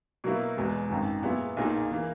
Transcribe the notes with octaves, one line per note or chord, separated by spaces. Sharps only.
B2 F#3 A#3 E4
E1 E2 B2 G#3
G#1 F#2 D#3
A#2 F#3 B3 E4 G#4
B1 A#2 A#3 D#4 G#4
E3 A#3